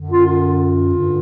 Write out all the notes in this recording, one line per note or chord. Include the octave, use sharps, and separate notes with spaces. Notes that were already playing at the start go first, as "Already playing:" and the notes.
Already playing: F#2 D3
F4
F4
G2 D3